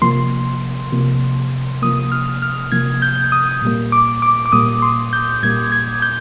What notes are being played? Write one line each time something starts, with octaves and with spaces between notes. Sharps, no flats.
C3 F3 A#3 C6
C3 F3 A#3
C3 F3 A#3 D#6
F6
F6
C3 F3 A#3 G#6
G6
D#6
A#2 G3 A#3
D6
D6
D6
A#2 G3 A#3 D#6
C6
G6
A#2 G3 A#3 G#6
G#6
G6